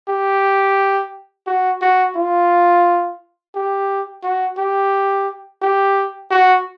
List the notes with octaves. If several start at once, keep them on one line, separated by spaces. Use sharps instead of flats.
G4
F#4
F#4
F4
G4
F#4
G4
G4
F#4